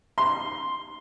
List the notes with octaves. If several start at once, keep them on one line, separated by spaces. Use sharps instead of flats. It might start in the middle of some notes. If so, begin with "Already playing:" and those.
C6